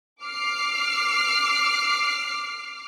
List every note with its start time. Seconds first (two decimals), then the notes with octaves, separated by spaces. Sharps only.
0.24 D6 F6 C7